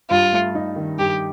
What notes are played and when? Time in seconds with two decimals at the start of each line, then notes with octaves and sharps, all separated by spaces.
0.10 G2 F4
0.33 A3
0.55 D#4
0.76 D#3
0.99 G2 G4